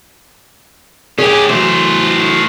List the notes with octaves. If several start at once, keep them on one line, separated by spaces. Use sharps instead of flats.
C#4 G4 G#4 G#5
E3 F#3 A3 C5